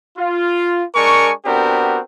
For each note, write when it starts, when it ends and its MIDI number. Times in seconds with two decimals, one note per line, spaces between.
0.18 0.83 65
0.95 1.32 56
0.95 1.32 62
0.95 1.32 70
0.95 1.32 80
0.95 1.32 85
1.45 2.00 59
1.45 2.00 60
1.45 2.00 62
1.45 2.00 66
1.45 2.00 67
1.45 2.00 70